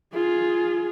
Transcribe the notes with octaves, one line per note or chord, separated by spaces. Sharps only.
F4 G#4